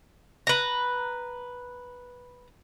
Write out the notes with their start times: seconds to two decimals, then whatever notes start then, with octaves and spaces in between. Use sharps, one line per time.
0.47 B4 A#5